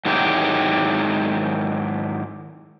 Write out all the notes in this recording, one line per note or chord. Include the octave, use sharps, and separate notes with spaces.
G#2 D#3 F#3 G#3 E4 G4